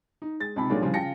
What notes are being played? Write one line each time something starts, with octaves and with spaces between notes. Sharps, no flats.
D#4
G#3 A6
C#2 C3 D#4 A5 B5
A#2 D#3 F#3 G#3 A3 D4
C2 A2 C#3 F3 G3
C#3 F4 G5 A5 A#6 C#7